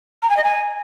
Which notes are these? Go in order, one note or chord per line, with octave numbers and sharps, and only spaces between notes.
A#5
G#5
D#5
G#5